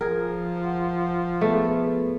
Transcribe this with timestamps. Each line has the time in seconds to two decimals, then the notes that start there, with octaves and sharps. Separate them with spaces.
0.01 F3 G#4 A#4
0.64 F#5
1.41 A3 B3 G#4 B4